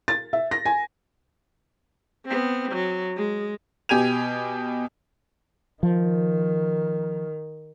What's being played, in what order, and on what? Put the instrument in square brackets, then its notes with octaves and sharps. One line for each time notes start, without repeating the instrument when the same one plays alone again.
[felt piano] A6
E5
A#6
G#5
[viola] B3 C4
F#3
G#3
[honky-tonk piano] B2 G4 G#5 G#6 D#7 F7
[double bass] D#3 [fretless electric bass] F3